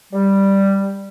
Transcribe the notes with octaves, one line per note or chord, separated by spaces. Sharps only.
G3